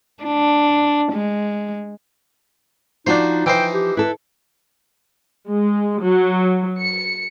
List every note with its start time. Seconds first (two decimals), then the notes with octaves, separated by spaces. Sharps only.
0.24 D4
1.12 G#3
3.07 F3 D4 D#4 F4 F#4 C5
3.46 E3 F3 D#4 C5 G5
3.74 G4
3.97 E4 A4 B4
5.47 G#3
6.03 F#3
6.80 C#7